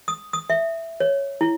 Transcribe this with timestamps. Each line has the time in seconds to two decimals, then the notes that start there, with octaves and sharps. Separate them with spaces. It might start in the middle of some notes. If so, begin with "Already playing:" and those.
0.08 D#6
0.33 D#6
0.50 E5
1.00 C#5
1.41 E4